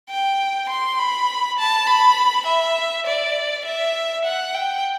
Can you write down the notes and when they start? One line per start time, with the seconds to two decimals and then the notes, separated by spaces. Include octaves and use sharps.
0.10 G5
0.69 C6
0.99 B5
1.59 A5
1.87 B5
2.46 E5
3.06 D5
3.65 E5
4.25 F#5
4.54 G5